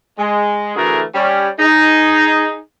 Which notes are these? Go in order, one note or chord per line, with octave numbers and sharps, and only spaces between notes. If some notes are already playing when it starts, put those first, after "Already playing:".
G#3
D3 E3 A3 F#4 G#4 A#4
G3 C#4
D#4 G#4